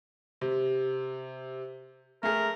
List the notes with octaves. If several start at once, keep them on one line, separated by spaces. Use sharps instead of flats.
C3
A3 G#4 A#4